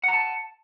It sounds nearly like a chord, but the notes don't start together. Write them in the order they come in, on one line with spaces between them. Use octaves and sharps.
F#5 A#5 A5